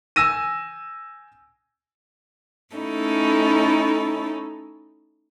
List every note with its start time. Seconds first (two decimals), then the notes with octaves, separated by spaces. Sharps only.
0.16 G#5 E6 A#6 D#7
2.74 A3 C#4 D#4 E4 A4